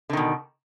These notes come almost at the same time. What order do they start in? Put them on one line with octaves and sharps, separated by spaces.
D3 D#3 B2